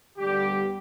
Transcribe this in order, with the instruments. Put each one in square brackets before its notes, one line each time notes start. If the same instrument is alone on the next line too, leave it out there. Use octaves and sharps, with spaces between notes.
[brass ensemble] D2 D3 G3 B3 [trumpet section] G4